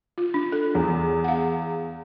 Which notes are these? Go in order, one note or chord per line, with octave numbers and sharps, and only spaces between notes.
F4
D4
A4
E2
F5 F#5